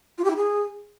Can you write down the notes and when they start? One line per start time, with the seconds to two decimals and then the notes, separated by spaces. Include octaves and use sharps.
0.18 F4
0.24 G4
0.30 E4
0.36 G#4